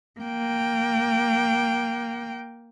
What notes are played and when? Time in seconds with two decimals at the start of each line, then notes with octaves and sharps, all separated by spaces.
0.20 A#3 G5